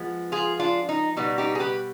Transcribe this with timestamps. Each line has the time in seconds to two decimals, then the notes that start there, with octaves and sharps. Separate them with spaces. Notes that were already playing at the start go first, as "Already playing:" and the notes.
Already playing: F3 G#3 B3
0.32 F4 G#4
0.59 D4 F4
0.89 D#4
1.16 B2 G3 B3 D#4
1.38 D#4 G4
1.55 G#4
1.59 G4 B4